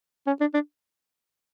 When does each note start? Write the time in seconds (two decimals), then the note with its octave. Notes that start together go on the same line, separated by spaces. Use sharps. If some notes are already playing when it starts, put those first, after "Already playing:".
0.27 C#4
0.41 D4
0.54 D4